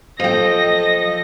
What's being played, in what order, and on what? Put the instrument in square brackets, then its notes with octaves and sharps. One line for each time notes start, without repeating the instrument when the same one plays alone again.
[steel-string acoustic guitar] F3 G5 [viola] A4 D#5 [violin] A#6